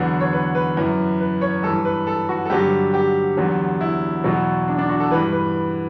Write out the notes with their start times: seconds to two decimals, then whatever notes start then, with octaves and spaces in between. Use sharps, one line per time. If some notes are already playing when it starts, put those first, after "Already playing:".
Already playing: E2 D3 F#3 B4
0.20 C#5
0.33 B4
0.55 B4
0.76 F#2 E3
1.20 B4
1.41 C#5
1.63 G2 E3 A4
1.85 B4
2.07 A4
2.29 F#4
2.45 A4
2.50 G2 D3 F#3 G4
2.94 G4
3.37 E2 D3 F#3
3.81 E4
4.24 E2 B2 F#3
4.68 D4
4.78 D4
4.89 F#4
5.00 A4
5.11 G2 E3 B4
5.32 B4